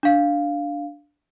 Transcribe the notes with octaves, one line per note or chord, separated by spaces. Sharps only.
D4 F5